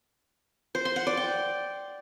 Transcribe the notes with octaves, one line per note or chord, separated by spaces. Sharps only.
C5
C6
F#5
D5
G5